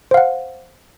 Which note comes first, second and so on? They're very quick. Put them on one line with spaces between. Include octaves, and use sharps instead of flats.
C5 F5 F#5